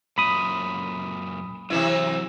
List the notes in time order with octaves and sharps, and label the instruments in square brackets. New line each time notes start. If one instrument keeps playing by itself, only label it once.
[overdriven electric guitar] F#2 A#2 [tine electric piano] B5 D#6
[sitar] C3 E3 E4 [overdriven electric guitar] F#3 E5